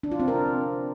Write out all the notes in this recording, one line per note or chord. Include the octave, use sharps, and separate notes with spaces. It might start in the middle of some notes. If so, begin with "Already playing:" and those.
D4
F4
C4
A#4